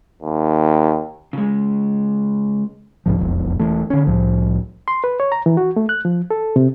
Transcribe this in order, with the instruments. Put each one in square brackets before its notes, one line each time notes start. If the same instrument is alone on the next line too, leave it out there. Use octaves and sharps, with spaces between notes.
[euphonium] D#2
[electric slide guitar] C#3 G#3
[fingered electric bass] C2 G#2 F3
E1 B1 F2
E1 E3 A3
D3 C#4
C2 A2 F3
[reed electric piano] C6
B4
C#5
A#5
E3
F#4
A3
F#6
F3
A4
C3